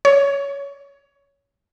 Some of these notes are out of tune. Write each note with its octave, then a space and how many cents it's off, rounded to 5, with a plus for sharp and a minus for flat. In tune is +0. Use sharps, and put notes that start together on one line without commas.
C#5 +15